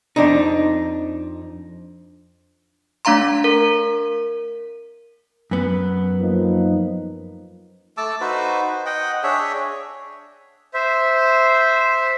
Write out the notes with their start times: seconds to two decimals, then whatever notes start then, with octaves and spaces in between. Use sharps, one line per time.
0.16 F2 D4 D#4
3.05 A3 D4 F5 A#5 C6
3.44 A#4
5.51 F#2 B3
6.21 F3 A#3 D#4
7.97 A3 A5 D6 E6
8.21 D#4 F#4 B4 C5
8.62 C5
8.86 D#5 F#5 G5
9.23 D4 G#4 C#5 E5
10.74 C5 E5